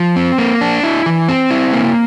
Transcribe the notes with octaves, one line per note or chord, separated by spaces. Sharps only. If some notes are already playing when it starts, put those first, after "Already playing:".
Already playing: F3
C4
A#3
D4
E4
E3
C4
E4
A#3